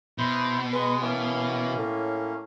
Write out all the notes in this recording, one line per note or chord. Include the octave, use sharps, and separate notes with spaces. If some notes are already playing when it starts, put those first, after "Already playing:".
B2 E4 C5
G#3 B4
E3 A#3 C#4
A2